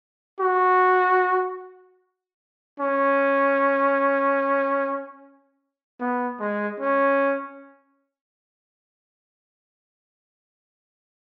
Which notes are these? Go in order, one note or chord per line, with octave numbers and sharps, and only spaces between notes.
F#4
C#4
B3
G#3
C#4